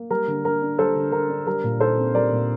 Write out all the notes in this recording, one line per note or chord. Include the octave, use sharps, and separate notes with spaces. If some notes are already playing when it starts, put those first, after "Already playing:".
Already playing: A#3
G3 A#4
D3
D3 A#4
D4
G3 A4 C5
D3
D3 A#4
D4
G3 A#4
A#2
D#4 A4 C5
C4
G3 A#4 D5
A#2